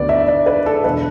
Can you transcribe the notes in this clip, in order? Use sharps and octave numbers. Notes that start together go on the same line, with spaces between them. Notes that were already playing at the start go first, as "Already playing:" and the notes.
Already playing: D2 D3 B3 D5
E5
D5
B4
A4
E1 D3 B4